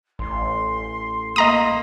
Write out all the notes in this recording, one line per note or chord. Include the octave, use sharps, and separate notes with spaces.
A1 C6
A#3 D#5 A#5 C6 D#6